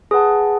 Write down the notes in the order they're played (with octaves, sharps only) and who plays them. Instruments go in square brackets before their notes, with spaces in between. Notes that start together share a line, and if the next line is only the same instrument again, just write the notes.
[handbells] G#4 B4 F#5 A5